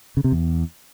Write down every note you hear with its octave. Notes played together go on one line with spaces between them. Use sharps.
C#3
C3
E2